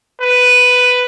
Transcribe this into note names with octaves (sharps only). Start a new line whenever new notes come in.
B4